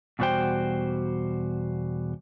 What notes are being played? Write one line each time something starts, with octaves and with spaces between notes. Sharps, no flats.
E2 B2 G3 F#4 C5 G5